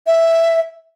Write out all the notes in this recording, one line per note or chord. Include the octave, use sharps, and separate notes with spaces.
E5